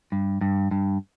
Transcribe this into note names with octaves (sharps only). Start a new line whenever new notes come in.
G2
G2
G2